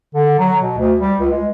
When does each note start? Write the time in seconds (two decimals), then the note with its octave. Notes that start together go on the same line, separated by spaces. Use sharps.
0.15 D3
0.39 F#3
0.62 B2
0.78 D2
1.00 G3
1.20 C#2
1.32 G#3